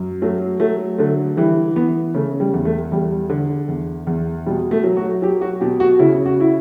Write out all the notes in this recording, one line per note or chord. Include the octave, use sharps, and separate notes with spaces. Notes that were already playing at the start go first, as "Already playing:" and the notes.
Already playing: F#2
F#3 A3
F#3 A3
D3 A3
E3 G3
E3 B3
C#3 A3
G3
E2
A3
E2 G3
D3
E2
E2
B2 G3
A3
F#3
F#4
F#3 G4
F#4
B2 G4
F#4
C#3 E4
F#4
E4